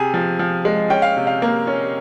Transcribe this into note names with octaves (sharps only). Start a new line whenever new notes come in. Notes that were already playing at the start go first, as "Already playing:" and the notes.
Already playing: C3 G#4 G#5
F3
F3
G#3
C#4 G5
F5
C3
F5
A#3
C#4